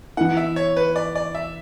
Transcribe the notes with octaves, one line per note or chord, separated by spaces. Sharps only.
E3 B3 E4 F#5
E5
C#5
B4
D5
D5
E5